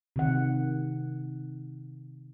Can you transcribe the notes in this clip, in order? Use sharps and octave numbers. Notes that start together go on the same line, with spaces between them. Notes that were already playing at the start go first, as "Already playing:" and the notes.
C3 D#3 F#5